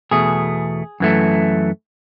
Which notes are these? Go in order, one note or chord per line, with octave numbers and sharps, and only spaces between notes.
E2 B2 A3 G#4
F#2 E3 A3